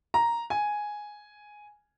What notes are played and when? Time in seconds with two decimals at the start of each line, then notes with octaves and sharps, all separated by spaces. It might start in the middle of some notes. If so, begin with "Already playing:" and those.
0.14 A#5
0.50 G#5